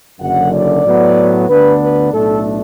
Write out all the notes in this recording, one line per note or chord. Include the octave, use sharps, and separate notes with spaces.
F#1 F#2 D3 F#5
D5
A2 F#3 B3
D2 D3 B3 D4 B4
B4
B1 A2 A3 D4 A4